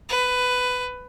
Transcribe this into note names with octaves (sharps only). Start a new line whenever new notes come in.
B4